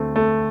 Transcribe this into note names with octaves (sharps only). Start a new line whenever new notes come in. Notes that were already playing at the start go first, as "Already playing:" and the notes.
Already playing: D2 D3 A3 C4
A3